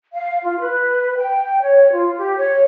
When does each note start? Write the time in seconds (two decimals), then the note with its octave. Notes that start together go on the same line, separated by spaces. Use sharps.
0.14 F5
0.43 F4
0.60 B4
1.17 G5
1.62 C#5
1.93 F4
2.18 G4
2.38 C#5